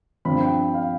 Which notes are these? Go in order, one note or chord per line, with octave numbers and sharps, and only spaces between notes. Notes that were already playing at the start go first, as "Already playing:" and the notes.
G2 F3 C4 B5
G5
F5